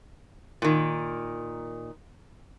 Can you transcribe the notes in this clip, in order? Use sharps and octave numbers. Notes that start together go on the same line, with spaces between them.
A#2 D#3